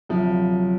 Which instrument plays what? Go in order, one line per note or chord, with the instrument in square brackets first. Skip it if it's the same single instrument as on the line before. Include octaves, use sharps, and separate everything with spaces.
[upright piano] D2 C3 F3 [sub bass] F#3